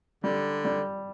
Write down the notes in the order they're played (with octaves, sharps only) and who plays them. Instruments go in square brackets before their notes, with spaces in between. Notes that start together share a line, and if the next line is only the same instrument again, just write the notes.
[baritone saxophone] D3 [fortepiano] G3
[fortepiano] G3